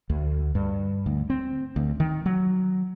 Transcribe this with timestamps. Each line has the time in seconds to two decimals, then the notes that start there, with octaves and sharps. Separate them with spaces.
0.10 D2
0.55 G2
1.06 D2
1.30 C4
1.76 D2
2.00 D#3
2.26 F#3